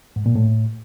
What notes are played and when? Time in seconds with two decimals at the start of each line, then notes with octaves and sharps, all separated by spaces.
0.16 G#2
0.26 A#2
0.35 A2